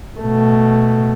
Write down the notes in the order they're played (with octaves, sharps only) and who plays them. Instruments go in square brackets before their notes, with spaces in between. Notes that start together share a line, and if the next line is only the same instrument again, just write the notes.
[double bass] B2 A3